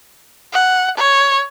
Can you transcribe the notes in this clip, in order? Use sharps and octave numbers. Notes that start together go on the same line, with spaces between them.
F#5
C#5